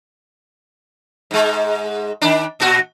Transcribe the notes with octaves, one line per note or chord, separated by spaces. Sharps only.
G#2 G#3
D#3 D4
A#2 F#4